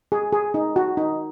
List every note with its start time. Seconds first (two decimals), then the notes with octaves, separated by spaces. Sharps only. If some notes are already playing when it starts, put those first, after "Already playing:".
0.12 G#4
0.32 G#4
0.54 D#4
0.76 F#4
0.97 D#4